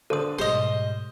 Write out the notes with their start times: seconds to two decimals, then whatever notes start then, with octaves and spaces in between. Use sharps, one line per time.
0.10 D3 A4 C5 D#6 D#7
0.38 G#2 B2 G3 C5 D#5